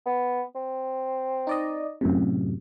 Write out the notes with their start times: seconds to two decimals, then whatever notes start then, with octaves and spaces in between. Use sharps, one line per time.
0.06 B3
0.55 C4
1.47 D#4 D5 D#5
2.01 F#2 A2 C3